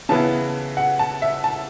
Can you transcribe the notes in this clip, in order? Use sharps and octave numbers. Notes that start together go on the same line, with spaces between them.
C#3 E3 B3 E4 A5
F#5
A5
E5
A5